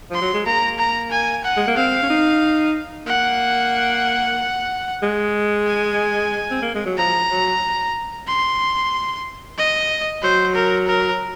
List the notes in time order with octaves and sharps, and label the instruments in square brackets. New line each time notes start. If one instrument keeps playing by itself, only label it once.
[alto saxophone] F3 [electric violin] C6
[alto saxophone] F#3
G#3
[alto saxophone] A#3 [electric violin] A#5
[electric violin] A#5
G#5
F#5
[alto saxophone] G#3
A#3
[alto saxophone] C4 [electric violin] F5
[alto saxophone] C#4
D#4
[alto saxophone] A#3 [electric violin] F#5
[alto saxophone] G#3
[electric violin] G#5
[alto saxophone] C4
A#3
G#3
F#3
[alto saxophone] F3 [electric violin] A#5
[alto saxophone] F#3
[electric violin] C6
D#5
[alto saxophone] F#3 [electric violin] C5
[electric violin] A#4
A#4